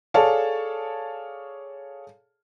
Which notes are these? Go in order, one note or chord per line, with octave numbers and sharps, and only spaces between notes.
G#4 A4 C#5 D5 F5 A5